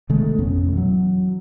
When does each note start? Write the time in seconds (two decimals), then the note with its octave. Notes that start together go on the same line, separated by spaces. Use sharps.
0.09 C3 D#3 G#3 A3
0.39 A1 F2 B2 C#4
0.73 E3 F#3